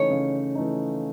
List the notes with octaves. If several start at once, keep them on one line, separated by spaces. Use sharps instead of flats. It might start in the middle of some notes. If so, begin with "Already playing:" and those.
Already playing: C#3 E3 A3 D#4 C#5
C#3
E3 A3 D#4